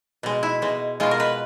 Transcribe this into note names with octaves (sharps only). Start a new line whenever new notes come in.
B2 G#3
E4
B2 G#3
B2 G#3 F4
A#4
B4